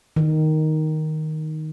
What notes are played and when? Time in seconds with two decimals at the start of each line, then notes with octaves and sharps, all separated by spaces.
0.16 D#3